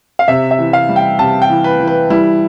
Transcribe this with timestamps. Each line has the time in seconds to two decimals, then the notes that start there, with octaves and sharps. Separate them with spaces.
0.19 F5
0.28 C3 E5
0.51 E5
0.59 E3
0.73 F5
0.89 G3
0.96 G5
1.19 C3 A5
1.42 G5
1.50 E3
1.64 B4
1.80 E3
1.88 B4
2.10 G3 E4